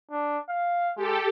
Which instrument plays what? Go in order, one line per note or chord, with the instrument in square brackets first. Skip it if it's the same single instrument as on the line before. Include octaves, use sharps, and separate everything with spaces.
[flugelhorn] D4
F5
[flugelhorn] G#3 [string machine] G4 A4